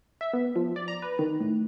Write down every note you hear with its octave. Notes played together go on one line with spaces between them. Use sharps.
E5
B3
F3
D5
A#5
B4
D#3
A2